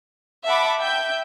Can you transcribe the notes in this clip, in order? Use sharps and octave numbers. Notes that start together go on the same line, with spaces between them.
E5 F#5 A5 B5 D6
E5 G5 G6